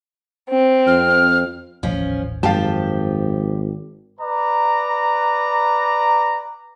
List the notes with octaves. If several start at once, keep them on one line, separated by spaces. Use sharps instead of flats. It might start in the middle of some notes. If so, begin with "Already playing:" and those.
C4
F2 F6
D#1 A1 F3 C#4
G#1 F#2 F3 G4 F5 G5 A5
B4 D5 A#5